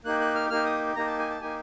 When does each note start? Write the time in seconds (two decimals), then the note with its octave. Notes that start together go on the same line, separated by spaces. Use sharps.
0.04 A#3 D#4 G4 F#6
0.20 F#6
0.35 F6
0.50 A#3 D#4 G4 F6
0.66 D#6
0.95 A#3 D#4 G4 A#5
1.06 A5
1.19 G#5
1.30 A5
1.41 A#3 D#4 G4 G#5